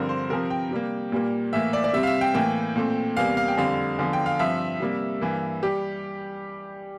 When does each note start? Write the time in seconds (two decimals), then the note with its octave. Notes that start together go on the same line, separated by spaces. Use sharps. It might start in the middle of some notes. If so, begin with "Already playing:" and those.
Already playing: G2 D3 F3 C4 A#4
0.09 C5
0.30 C3 F3 C4 A#4
0.50 G5
0.71 C3 G3 A#3
1.12 A#2 G3 A#3
1.53 A2 E3 A#3 E5
1.73 D5
1.84 D5
1.93 C3 G3 C4 E5
2.03 F5
2.07 E5
2.21 G5
2.34 A2 E3 A#3 G5
2.76 A#2 A3 C4
3.17 E2 C3 G3 A#3 F5
3.37 F5
3.48 G5
3.57 F2 D3 G3 C4 F5
3.99 E2 D3 F3
4.13 G5
4.26 F5
4.39 G2 F3 C4 E5
4.80 C3 G3 A#3
5.21 G2 E3 A#3
5.63 G3 G4